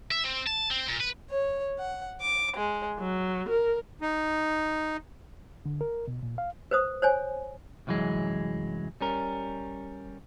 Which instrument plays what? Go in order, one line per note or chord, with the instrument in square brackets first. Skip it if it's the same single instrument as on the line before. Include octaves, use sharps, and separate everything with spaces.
[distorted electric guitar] E5
C4
A5
C4
A#2
B4
[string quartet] C#5
F#5
D6
G#3
F#3
A#4
[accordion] D#4
[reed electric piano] D3
A#4
B2
A#2
F5
[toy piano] B4 C5 D#6
C5 C#5 G#5
[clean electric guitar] C2 F#2 E3 F#3 G#3
G3 C#4 A#4